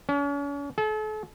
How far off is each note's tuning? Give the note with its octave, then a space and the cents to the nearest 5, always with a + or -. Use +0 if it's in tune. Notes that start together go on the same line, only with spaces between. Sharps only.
C#4 +40
A4 -40